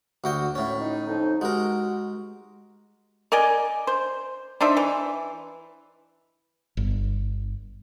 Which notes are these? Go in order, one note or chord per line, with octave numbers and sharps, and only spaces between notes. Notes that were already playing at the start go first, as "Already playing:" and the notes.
D2 F#4 G5
A2 C#4
D#4
F2 D#4
G#3 F#4 G4 A#4
A#4 D5 D#5 G#5
C5
D4 D#4 C5 E5
E3
G1